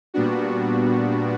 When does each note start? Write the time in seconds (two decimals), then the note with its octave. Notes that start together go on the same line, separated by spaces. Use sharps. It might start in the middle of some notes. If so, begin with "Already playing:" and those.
0.14 A#2 G3 B3 D4 F#4